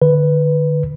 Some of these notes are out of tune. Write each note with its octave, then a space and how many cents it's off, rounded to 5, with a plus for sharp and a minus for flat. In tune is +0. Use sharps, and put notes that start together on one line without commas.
D3 +35 B4 +0